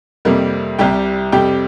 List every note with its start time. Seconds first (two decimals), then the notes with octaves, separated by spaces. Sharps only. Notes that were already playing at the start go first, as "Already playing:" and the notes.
0.25 F2 C3 G3 A#3 A#4
0.79 C2 C3 G3 G4 G5
1.32 F2 C3 G3 G4 G5